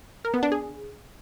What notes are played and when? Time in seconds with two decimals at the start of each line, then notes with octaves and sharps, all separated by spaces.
0.25 A#4
0.34 B3
0.43 D4
0.52 G#4